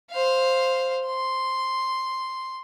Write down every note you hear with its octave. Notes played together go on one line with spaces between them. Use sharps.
C5 F5
C6